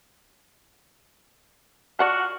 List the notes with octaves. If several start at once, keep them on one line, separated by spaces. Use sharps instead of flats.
F4 F#4 D5 F#5 A5